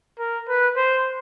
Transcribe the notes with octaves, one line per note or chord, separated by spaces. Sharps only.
A#4
B4
C5